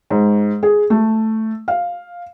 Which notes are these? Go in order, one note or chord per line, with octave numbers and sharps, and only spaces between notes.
G#2
G#4
A3
F5